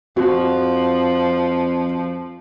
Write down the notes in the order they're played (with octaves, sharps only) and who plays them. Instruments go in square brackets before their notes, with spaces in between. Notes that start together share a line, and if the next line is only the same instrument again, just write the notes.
[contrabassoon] F2 [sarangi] F3 [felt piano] F#4